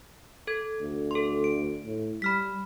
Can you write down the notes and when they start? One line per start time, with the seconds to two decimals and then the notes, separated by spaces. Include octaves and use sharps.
0.47 A4 G#6
0.80 D2
1.11 A4 C6
1.44 D7
1.85 A2
2.22 G3 B5 F6 B6